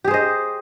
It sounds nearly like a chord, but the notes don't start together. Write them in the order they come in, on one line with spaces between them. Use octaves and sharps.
G4 G#4 C5 D#5